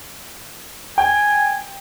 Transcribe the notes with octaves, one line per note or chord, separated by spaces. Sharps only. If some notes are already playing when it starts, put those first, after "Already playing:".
G5 G#5